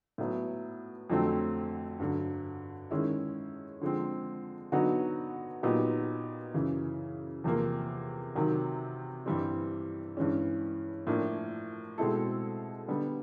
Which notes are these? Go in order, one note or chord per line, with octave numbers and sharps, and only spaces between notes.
A2 F#3 B3
F2 D3 F#3 A3 C4
G2 D3 F#3
D#3 G#3 C#4 E4
D3 F3 G#3 C4
D3 F#3 B3 D#4 F#4
A#2 F#3 B3 D#4 G4
F#2 C#3 E3
E2 C3 F3 A#3
C3 D#3 F#3
G2 E3 G3 C4
G2 E3 G#3 C#4
A2 F3 A#3 D4
B2 G#3 C4 E4 A4
D3 G3 B3